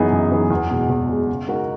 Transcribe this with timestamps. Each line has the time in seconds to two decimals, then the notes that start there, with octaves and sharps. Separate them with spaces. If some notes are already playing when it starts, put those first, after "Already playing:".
Already playing: F#2 E3 B3 D#4 G#4
0.12 F#2
0.32 E3 B3 D#4 G#4
0.50 E2
0.71 B2 G#3
0.89 E2
1.09 B2 G#3
1.29 C#3
1.48 G#3 D#4 F#4 A#4